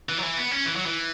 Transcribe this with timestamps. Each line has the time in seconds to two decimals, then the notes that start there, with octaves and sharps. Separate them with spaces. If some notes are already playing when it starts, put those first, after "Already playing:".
0.09 E3
0.18 F#3
0.23 E3
0.37 B3
0.51 C#4
0.65 E3
0.76 F#3
0.86 E3